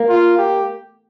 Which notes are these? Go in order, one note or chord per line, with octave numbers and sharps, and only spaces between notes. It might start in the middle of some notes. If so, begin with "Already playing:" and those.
Already playing: A#3
F4
G4